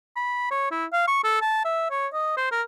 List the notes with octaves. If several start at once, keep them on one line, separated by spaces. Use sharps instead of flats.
B5
C#5
E4
F5
C#6
A4
A5
E5
C#5
D#5
C5
A#4